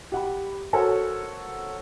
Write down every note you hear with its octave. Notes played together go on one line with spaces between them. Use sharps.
G4 F#5 B5
F#4 A4 A#4 C5 C#5 F#5